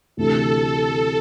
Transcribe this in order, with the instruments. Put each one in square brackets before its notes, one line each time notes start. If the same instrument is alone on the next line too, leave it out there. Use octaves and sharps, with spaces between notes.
[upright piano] D2 C3 E3 A3 [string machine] A4